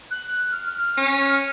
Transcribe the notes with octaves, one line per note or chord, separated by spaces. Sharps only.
F#6
F6
F6
C#4